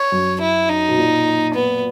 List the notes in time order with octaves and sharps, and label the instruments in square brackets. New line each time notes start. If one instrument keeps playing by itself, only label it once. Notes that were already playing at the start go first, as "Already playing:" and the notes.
Already playing: [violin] C#5
[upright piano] F#2
[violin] E4
D#4
[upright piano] B2
A#2
[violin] B3